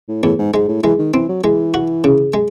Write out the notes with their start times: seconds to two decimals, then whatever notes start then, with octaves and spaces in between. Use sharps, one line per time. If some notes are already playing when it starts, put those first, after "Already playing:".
0.09 A2
0.23 E2 A2
0.39 G#2
0.53 G#2 G#3
0.69 A2
0.83 E3 G#3
0.99 D#3
1.14 E3 C4
1.29 F#3
1.44 E3 G#3
1.74 F#4
2.04 C#3
2.34 G#3